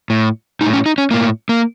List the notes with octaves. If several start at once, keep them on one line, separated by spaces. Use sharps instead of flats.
A2
A2 D#4
C#4
D#4
C#4
A2 A#3
A#3